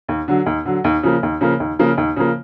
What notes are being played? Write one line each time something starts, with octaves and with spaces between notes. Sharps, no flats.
D#2
D3 F#3
D#2
D3 F#3
D#2
C#3 F3 A#3
D#2
C#3 F3 A#3
D#2
C#3 F3 A#3
D#2
C#3 F3 A#3